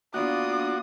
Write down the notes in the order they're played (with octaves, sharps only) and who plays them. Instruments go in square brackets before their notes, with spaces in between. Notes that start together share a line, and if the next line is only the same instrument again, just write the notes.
[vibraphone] A#3 B3 D4 [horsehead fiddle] F4 D5 [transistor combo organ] F#4 [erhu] D#6